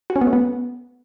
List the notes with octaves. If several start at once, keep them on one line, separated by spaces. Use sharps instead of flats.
F#4
C#4
B3
A3
B3